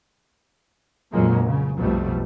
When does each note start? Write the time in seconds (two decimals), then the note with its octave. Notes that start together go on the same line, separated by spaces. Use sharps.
1.13 F2 A#2 D3 F#3 G#3 A#3
1.46 C#3
1.78 B1 F2 B2 F#3 G3 A3